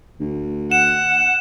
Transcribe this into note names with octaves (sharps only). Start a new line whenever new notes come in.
D2
F#5 E7